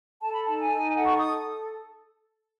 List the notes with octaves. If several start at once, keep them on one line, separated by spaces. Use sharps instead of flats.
A4 A5
B5
D#4 A5
G#5
D#4
A4 F#5
C#6
D#6
A4